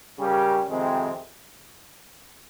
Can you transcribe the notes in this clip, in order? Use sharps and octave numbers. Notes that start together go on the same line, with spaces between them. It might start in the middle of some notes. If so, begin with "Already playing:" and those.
C#3 G3 C#4 G4 A#4
F2 C3 D#3 G#3 C4